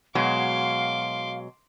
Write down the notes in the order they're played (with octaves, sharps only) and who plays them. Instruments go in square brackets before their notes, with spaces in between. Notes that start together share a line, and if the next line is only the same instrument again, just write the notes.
[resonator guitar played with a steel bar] B2 F#3 G#3 [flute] F5 [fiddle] C6 D6